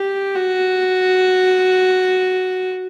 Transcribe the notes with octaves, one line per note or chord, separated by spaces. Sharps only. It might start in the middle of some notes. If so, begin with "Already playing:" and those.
Already playing: G4
F#4